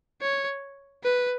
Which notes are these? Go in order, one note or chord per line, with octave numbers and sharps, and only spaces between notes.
C#5
B4